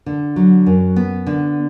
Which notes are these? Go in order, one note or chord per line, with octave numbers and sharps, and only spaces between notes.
D3
F#3
F#2
B3
D3